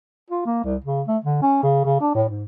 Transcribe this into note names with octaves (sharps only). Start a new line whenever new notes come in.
F4
A#3
C2
C#3
A3
D3
C#4
C#3
C#3
D4
A2
G#2